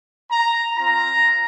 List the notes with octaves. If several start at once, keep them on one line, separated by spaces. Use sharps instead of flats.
A#5
C4 F4 A#5